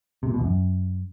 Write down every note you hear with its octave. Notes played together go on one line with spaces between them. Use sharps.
C3
A#2
B2
E2
F#2